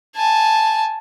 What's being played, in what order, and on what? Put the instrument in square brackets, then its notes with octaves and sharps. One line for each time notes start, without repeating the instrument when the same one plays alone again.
[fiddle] G#5 A5